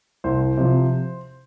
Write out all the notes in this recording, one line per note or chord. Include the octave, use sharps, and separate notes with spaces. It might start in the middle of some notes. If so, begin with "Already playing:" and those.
C2 C5
C3 F3